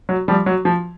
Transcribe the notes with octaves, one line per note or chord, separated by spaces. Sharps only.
F#3
F3 G3
F#3
F3